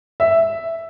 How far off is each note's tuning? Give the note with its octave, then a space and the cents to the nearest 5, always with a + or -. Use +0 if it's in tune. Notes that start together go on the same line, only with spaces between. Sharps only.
E5 +0